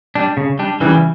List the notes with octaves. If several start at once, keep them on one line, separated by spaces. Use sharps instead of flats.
G3 D4
C#3
G3 D4
C#3 E3 G3